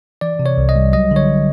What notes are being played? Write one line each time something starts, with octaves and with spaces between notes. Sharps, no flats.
E3 D5
C3
C#5
C2
D#5
G3
F#3 D#5
D3 C#5